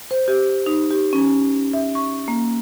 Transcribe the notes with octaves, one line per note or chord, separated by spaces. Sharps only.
C5
G4
D#4
G4
C#4
E5
C#6
A#3